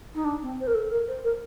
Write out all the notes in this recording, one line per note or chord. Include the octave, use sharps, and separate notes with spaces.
D#4
D4
C4
C5
A#4
A4
A#4
C5
A#4